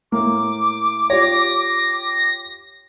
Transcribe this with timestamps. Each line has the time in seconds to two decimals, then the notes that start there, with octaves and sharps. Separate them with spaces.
0.12 A2 A#3 A#4 D6
1.10 F4 G4 C#5 A#6